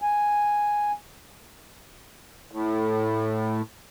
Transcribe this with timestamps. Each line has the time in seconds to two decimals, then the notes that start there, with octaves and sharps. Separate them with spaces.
0.02 G#5
2.52 A2